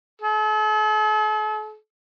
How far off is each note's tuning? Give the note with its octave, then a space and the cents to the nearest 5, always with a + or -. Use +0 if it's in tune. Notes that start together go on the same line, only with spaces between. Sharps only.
A4 -45